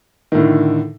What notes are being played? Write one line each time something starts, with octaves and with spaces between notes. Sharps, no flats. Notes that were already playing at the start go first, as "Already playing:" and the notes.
A2 D3 D#3